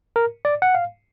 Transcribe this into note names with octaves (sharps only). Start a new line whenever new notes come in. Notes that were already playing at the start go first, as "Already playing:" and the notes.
A#4
D5
F#5
F5